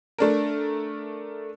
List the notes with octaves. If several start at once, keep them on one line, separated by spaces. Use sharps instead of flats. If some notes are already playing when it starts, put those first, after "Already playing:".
A3 D4 A#4